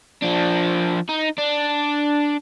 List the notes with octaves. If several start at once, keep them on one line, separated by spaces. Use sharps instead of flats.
F3 D4
D#4
D4